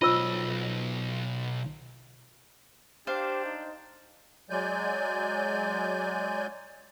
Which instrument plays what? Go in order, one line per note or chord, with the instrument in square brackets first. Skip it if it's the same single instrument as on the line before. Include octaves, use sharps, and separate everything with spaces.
[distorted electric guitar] B1 D#5 [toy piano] F4 C5 E6
[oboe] D4 [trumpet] G4 [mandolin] C5 F5
[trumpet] D#4
[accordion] F#3 G#3 D5 G#5 G6